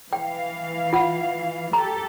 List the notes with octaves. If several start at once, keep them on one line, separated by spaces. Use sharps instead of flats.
E3 F5 G5
F4 F#5
G4 A4 A#5